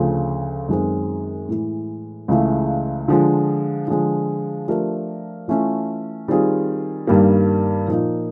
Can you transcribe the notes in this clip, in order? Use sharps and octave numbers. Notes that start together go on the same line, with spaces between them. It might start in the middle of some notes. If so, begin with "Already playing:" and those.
Already playing: D2 C#3 F3
F#2 D#3 G#3 C4
A2 E3 G#3
C#2 C#3 E3 A3
D3 F3 G#3
D3 F3 G#3
F3 A3 D4 G4 A#4
E3 A3 C#4 F4
D#3 G3 C4 F4 G#4
G2 D#3 G3 A#3
A#2 F3 A#3 D#4